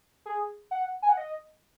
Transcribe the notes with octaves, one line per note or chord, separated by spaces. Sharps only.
G#4
F#5
G#5
F#5
D#5